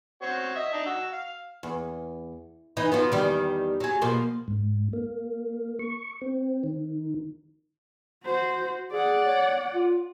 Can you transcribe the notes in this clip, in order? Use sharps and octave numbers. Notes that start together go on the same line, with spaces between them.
C4 F#4 C#5
D#5 E5
D4 D#4
F#4 E6
F5
E2
E3 D#4
F3 F#3 B3
E2 D#3 G3
F#3 G#4
B2 F3 A#3
G#2
A#3
C#6
C4
D#3
F#4 C5
G#4 D5 F#5
C#5
F4